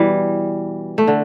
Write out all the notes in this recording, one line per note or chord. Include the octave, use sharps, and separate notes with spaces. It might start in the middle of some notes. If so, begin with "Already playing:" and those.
Already playing: B2 E3 G3
A3
D3